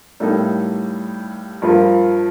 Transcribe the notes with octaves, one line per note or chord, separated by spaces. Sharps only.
A2 G3 A#3 D#4 A4
G2 F3 A#3 F4 A#4